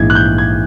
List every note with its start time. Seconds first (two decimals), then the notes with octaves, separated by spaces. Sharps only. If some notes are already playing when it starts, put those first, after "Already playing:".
Already playing: A#1 G#2 E3 G#6
0.10 F#6
0.15 G6
0.38 G#6